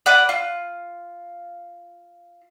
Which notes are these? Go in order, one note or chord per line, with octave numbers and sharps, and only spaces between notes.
B4 D5 F#5
F4